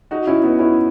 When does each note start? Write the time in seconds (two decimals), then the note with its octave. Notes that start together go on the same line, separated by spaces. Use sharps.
0.11 D#4 F#4
0.27 C#4 E4
0.43 B3 D#4
0.59 C#4 E4